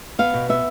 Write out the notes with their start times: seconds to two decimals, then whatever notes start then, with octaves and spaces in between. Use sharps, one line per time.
0.19 B3 F5
0.34 B2
0.49 B3 E5